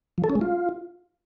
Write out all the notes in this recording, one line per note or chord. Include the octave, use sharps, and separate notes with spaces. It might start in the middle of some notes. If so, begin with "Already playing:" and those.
F3
A4
C#4
G#3
F4